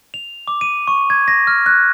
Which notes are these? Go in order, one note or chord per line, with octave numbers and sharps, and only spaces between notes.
F7
D6
D#7
C#6
G#6
A#6
F6
F#6